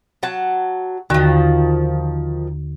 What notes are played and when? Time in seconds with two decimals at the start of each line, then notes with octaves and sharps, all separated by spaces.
0.23 F#3 F#5 A5
1.10 D#2 D3 D#3 F3 F#4